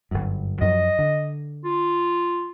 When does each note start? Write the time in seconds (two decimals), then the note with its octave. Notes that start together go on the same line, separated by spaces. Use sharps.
0.11 G1 F#2
0.61 F#2 F3 F#3 D#5
0.99 D3
1.64 F4